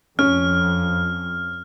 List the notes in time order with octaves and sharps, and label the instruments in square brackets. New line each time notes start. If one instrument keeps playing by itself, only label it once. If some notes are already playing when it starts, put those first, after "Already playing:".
[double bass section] F2 [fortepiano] C#4 [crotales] F6